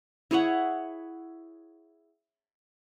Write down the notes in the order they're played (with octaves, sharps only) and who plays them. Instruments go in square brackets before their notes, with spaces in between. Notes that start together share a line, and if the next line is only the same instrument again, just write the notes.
[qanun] E4 G#4 C#5 F#5